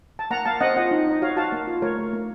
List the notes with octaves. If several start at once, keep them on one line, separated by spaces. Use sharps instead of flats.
A5
A#3 F#5 A#5
A#3 F5 A5
C4 D#5 F#5
F4 D#5 F#5
D#4
D#4 D#5
F#4 C#5 F5
F#4 F5 A5
A#3
F4
A3 A#4 C#5
A3
A#3